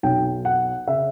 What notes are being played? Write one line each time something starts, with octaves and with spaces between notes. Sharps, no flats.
B1 B2 G5
F#5
C#3 E5